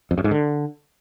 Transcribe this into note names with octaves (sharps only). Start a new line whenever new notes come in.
F2
F#2
G#2
D3